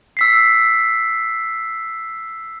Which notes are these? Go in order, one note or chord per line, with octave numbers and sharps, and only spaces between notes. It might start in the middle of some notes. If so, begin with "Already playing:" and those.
E6 B6 C7